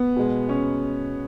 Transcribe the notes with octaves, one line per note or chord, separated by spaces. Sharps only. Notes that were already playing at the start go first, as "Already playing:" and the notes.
Already playing: B3
B2 G#3
C#4